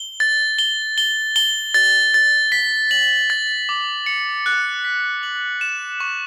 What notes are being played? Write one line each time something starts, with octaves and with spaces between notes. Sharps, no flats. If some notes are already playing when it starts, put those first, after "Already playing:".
Already playing: G7
A6
G7
G7
G7
A6
A6
B6
F#7
A6
D6
C#7
F#6
B6
F#7
E7
C#6